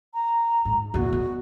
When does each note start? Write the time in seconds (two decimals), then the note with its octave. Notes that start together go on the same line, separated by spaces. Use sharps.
0.14 A#5
0.65 G#2
0.94 E2 A#2 F#4
1.12 B2